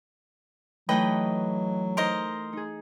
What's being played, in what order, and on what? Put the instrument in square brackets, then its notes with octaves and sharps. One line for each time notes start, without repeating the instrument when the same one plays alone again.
[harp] E3 A3 D#4 [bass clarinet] F#3 [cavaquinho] B4 D#5 G5
[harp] D#4 [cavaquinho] A#4 C5 D#5
[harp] D#4 G#4